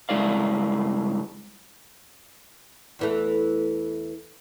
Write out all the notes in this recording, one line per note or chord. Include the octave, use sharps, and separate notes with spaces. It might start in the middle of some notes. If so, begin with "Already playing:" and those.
G2 C#3 G#3 E4 D5 F5
E2 E3 A3